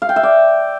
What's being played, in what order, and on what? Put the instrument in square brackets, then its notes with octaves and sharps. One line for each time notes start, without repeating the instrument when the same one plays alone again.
[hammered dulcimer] F5
G5
E5
D5